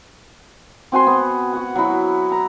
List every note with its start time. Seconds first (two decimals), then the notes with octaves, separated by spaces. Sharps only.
0.92 C4 F#4 G#5 C6
1.07 B3
1.53 F#4 F#5
1.75 F#3 E4
2.32 A#5